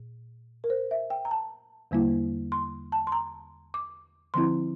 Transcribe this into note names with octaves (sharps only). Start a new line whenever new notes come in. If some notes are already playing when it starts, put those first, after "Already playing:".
Already playing: A#2
A#4
C5
E5
G5
A#5
A5
E2 D3 G3 A#3 E4
C6
A5
C6
A#5
D6
D3 F3 C4 E4 C6